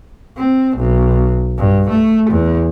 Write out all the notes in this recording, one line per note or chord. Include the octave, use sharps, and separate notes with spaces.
C4
B1
G2
A3
E2